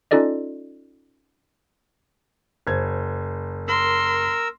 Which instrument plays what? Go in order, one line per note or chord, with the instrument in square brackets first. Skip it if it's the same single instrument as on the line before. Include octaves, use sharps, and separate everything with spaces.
[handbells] C#4 D#4 F4 A4 D5 D#5
[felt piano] F#1 C5 G#6
[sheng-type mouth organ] A#4 E6 [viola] C6